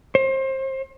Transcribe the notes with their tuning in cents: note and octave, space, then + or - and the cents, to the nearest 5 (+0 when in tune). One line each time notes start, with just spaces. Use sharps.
C5 +30